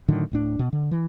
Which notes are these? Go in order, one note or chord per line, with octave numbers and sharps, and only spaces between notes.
A2 D3 D#3 F#3
D1 A2 D4
B2
D3
E3